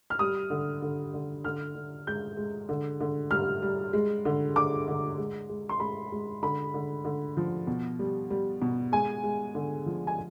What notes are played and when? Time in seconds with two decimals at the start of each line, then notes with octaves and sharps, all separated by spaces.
0.10 F6
0.19 G3 D#6
0.50 D3
0.82 D3
1.14 D3
1.45 D3 F6
1.75 D3
2.07 G#3 G6
2.37 G#3
2.69 D3
3.00 D3
3.31 G3 F6
3.62 G3
3.93 G#3
4.25 D3
4.56 D3 D6
4.88 D3
5.18 G#3
5.49 G#3
5.69 C6
5.80 G#3 B5
6.12 G#3
6.43 D3 B5
6.74 D3
7.05 D3
7.37 F3
7.67 B2
7.99 G3
8.30 G3
8.62 B2
8.92 G#3 G#5
9.24 G#3
9.55 D3
9.86 F3
10.07 G#5